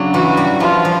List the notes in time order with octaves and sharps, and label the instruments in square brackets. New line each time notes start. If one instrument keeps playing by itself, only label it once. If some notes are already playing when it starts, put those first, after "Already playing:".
Already playing: [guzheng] C#3 F#3 D4
[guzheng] E3 [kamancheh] F#4
[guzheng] G3
[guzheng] F3 [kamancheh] F4
[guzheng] F3